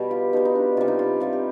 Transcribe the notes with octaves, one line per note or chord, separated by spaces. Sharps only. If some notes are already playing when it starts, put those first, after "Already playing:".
Already playing: B2 G3 G4
F4
B2 G3 D#4
D#4
D4
C3 G3 F4
D#4
F4
C3 G3 F4
G4